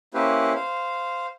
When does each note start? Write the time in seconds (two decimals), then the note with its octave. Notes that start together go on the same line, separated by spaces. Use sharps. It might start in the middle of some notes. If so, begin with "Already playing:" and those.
0.14 A#3 C#4 E4 G4 B4 C5
0.55 C5 F5